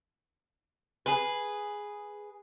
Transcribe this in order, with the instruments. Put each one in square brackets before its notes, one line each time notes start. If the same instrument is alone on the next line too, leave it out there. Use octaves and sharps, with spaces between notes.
[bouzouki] G#4 B4